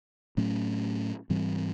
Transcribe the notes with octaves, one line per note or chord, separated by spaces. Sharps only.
A2 F#3 A3 C#4
G#2 E3 G3 C4